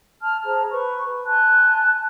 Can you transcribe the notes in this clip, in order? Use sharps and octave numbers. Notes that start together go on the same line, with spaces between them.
A5 F6
G#4 C5 A5 A#5
B4 C#6
G#5 A5 C6 F#6